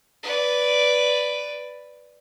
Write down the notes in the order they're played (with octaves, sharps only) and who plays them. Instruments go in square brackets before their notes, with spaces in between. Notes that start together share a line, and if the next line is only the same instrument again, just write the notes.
[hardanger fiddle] B4 D5